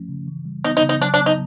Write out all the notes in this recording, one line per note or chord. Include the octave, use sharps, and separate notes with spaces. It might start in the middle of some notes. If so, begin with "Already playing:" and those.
Already playing: F3 A3 C#4
C#3
E3
G3
B3 D#4
D#4
C#3
D#4
F#3 D4
D4
B3
D#4